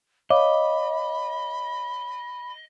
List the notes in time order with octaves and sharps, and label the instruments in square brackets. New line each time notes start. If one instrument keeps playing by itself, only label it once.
[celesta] C#5 F5 D6 [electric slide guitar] D#5 [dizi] B5